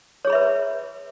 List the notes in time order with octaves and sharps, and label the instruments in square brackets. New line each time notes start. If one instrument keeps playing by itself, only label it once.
[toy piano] C#5
G#4
B5
E5
B4